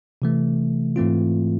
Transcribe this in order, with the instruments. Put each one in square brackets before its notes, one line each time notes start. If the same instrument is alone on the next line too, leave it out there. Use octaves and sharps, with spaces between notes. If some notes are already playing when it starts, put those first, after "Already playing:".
[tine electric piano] C3 E3 A3
G#2 E3 A3 C4 F4